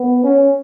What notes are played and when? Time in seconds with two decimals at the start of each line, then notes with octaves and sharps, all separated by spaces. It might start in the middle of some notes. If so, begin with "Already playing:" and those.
Already playing: B3
0.24 C#4